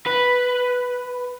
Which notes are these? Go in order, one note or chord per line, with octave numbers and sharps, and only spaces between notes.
B4